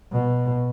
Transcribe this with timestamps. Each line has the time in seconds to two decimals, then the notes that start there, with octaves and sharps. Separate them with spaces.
0.12 B2